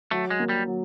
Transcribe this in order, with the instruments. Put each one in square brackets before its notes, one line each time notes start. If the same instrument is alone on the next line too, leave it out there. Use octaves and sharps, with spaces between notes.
[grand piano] F#3 [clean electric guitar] A3
[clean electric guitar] G#3
[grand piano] A#3
[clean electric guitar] G3
[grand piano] F#3